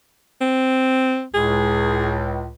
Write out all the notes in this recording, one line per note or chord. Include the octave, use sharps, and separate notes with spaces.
C4
C#2 A2 G#4